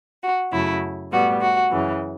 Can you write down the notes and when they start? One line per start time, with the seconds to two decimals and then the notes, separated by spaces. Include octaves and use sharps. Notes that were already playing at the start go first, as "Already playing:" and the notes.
0.22 F#4
0.52 F#2 C#3 F#3 A3 E4
1.12 A2 G3 B3 F#4
1.41 F#4
1.70 F#2 C#3 E3